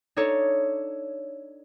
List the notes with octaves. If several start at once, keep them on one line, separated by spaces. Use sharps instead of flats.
D4 D#4 A4 C#5